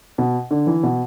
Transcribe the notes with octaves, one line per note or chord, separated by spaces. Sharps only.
B2
D3
E3
B2